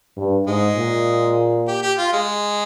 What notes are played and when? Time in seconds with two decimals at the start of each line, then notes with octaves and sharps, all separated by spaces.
0.17 G2
0.47 G#2 G#3
0.77 A#2
1.68 G4
1.82 G4
1.98 F4
2.13 G#3